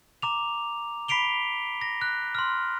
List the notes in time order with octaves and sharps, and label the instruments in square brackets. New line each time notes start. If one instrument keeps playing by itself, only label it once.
[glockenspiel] A#5 D6 F7
B5 B6 C7 D7 F7 G7
A#6
F#6
C6 F6